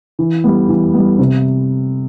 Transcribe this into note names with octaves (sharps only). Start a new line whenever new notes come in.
E3
G3 B3
E3
G3 B3
C3